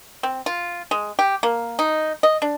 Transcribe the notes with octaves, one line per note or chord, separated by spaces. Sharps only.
C4
F4
G#3
G4
A#3
D#4
D#5
D4